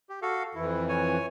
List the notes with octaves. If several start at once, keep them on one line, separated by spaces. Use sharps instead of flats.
G4
F#4 A4 F5
F2 E3 E4
C#5 G#5